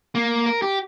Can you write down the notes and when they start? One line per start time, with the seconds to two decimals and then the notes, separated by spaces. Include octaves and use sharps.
0.15 A#3
0.46 A#4
0.62 G4